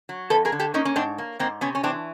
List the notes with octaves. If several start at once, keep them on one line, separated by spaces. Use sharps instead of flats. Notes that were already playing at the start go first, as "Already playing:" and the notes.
F#3
F2 A4 B4
G#4 A#4
D3
G4 A4
A#3 C#4 D#4
C#4
G#2 C4 D4
A#3
G#2 A#3 C4
C3 B3 C#4
C#4
E3 C4 D4